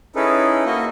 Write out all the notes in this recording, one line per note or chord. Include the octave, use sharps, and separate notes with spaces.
C#4 D#4 E4 G#4 A4 B4
A#3 F#4 D#5